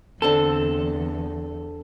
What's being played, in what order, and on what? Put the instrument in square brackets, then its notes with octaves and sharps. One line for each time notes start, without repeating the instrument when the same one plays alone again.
[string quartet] E2 [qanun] D3 C4 A5 [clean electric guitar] A4